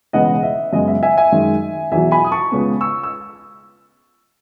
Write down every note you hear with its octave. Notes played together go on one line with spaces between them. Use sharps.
E1 E2 C#3 G#3 B3 D#5 F#5
E5
F#2 C#3 G#3 B3 D#5
E5
E5 G#5
E5 G#5
F#2 D#3 G#3
E2 B2 F#3 E5 G#5
G#5 B5
D#6
A5 C#6
C#2 C#3 G#3 B3
C#6 E6
E6